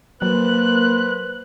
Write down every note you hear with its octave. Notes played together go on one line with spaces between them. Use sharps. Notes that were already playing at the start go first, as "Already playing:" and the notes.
F#3 A#3 B4 C5 F#6